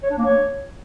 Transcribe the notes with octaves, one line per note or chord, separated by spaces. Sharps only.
C#5
D4
A#3
C#5